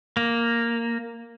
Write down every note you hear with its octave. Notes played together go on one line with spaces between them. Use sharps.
A#3